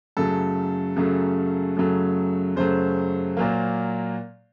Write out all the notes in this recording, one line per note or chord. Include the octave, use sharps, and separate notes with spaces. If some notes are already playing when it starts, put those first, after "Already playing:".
F#2 C#3 F#3 A3 A4
F#2 C#3 F#3 A3
F#2 C#3 F#3 A3
F#2 C#3 F#3 A3 C5
A#2 F#3 A#3